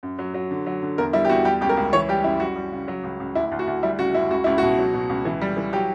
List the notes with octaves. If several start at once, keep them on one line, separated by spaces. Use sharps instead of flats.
F#2
F#3
F#3
D3
F#3
D3
E2 A#4
G3 E4
G4
E2 F#4
G3 G4
C#2 G4
A#4
C#2
E3 C#5
G3 G4
F#2 E4
G3 F#4
G3
C#3
F#3
C#2
C#2
D2 E4
D2
F#4
D2
G3 E4
C#3 F#4
F#2 E4
C#2 F#4
C#2 E4
B2 F#4
F#3
B2
C#2
E3
G3
E3
F#3 G4